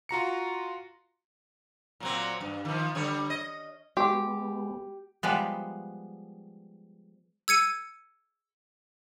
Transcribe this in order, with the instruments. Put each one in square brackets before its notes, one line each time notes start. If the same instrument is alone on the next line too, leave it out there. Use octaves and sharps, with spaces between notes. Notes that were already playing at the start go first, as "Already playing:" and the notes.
[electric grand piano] F4 F#4 A#5 C#7
[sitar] A#2 F#3 C4
G2
D#3 F3
D3 G3 C#5
D#5
[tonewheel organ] G#3 B3 [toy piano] F#4 [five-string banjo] G4
[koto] F3 G3 G#3 B3
[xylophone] E6 G#6 C#7 D#7